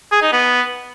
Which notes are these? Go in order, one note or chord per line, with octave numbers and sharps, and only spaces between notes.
G#4
D#4
B3